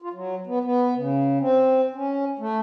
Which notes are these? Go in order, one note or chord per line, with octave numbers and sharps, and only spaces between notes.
F4
F#3
B3
B3
C#3
C4
C#4
A3